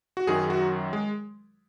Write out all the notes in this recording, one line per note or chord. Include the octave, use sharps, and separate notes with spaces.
F#4
F#2 D#3 F#3 G#4
F#4
G#3